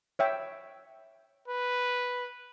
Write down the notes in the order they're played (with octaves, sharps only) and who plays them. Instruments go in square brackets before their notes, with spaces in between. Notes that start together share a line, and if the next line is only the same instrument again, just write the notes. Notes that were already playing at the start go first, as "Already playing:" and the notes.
[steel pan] C#5 E5 G5
[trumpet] B4